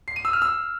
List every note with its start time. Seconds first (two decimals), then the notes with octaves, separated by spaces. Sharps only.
0.08 C7
0.16 D#7
0.25 E6
0.33 F6
0.42 E6